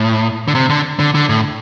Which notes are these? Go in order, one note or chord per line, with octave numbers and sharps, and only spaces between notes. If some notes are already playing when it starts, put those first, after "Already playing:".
Already playing: A2
D3
C3
D3
D3
D3
A2